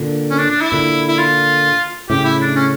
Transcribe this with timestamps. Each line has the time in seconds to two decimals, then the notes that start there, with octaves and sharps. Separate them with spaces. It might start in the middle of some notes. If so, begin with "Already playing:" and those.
Already playing: A#2 D3
0.30 C#4
0.38 D4
0.50 D4
0.61 E4
0.72 A#2 D3
1.08 E4
1.18 F4
2.09 A2 C#3 G4
2.25 E4
2.41 D4
2.56 C#4